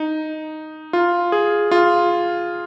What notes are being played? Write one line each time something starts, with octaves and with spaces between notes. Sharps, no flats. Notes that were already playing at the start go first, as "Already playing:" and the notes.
Already playing: D#4
F4
G#4
F4